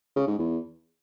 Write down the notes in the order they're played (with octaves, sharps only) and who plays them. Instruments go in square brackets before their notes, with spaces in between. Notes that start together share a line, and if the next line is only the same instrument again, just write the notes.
[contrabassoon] C#3
G#2
E2